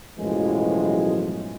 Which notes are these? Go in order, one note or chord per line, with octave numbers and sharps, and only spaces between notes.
B1 F#2 A2 E3 F3 G#3